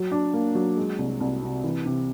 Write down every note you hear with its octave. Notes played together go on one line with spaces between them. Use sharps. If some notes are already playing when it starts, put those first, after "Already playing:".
Already playing: F#3
D4
A#3
F#3
G#3
C2
C2
C3
E3
C3